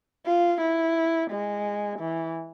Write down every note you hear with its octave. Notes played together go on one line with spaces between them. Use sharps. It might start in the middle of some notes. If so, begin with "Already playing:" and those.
F4
E4
G#3
E3